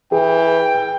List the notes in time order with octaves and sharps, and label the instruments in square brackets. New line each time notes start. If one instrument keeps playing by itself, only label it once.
[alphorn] E3 [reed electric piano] G#4 [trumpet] G5